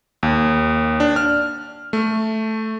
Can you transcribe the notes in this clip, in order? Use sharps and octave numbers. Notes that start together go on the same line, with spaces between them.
D#2
D4
F6
A3